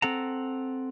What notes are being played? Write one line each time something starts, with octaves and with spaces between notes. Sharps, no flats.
C4 A4 F#5 A#5